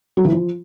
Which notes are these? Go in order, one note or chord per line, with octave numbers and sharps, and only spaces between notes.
F#3
E3
F3